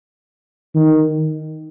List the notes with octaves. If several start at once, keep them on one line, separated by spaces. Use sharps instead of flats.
D#3